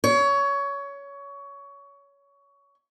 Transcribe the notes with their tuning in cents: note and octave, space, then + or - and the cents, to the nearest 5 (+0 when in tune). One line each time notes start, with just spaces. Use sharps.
C#5 +20